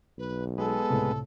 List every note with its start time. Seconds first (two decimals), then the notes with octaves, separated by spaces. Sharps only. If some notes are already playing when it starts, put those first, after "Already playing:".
0.18 B1 B4
0.58 G#3 B3 A4
0.90 C#2 A2 C3